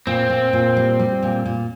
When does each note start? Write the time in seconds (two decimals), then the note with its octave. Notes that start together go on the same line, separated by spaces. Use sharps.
0.07 A#2 C4
0.30 A#2
0.53 A#2
0.77 G3
0.99 G3
1.22 A#2
1.46 A#2